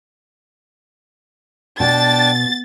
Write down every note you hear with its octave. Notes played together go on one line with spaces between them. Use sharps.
B2 D4 G5 A5 A6